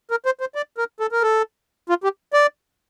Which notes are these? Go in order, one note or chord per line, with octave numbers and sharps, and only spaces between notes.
A#4
C5
C5
D5
A#4
A4
A#4
A4
F4
G4
D5